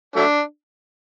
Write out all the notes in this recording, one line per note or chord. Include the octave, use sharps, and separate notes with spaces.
F#3 A3 D4